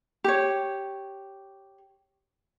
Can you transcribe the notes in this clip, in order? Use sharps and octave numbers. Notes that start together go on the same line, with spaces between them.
G4 C#5